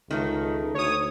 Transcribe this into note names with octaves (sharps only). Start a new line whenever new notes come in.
C#2 D#3 A3 D#4
D2 C#5 D#6